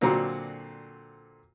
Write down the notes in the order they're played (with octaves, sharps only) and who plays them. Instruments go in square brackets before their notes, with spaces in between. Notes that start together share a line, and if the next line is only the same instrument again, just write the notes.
[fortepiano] A#2 D3 F#3 C4 F#4 A#5